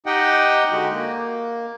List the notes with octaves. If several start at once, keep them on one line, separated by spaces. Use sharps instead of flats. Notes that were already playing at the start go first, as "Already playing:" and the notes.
D#4 G4 D#5 F#5 G5
D3 G#3 F#4
A#3